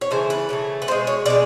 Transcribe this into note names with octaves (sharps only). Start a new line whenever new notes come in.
C#5
C#3 E3 A3 C5
B4
C#3 E3 A3
B4
B2 G#3 C5
C#5
B2 G#3 D5